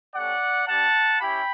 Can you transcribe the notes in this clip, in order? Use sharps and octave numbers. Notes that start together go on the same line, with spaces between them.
A3 C#4 G4 D5 F#5
G3 D4 G4 F#5 A5
C#4 E4 G4 G5 B5